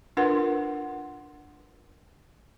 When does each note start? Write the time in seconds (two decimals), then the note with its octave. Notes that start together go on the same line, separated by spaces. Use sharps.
0.17 D4 F4 A#4 B4 F#5 C6